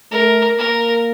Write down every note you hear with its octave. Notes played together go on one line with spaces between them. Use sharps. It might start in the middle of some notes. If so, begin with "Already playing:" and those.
A3 A#4
A#3 A#4